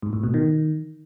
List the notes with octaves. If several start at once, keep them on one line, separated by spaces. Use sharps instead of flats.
G#2
A2
B2
D#3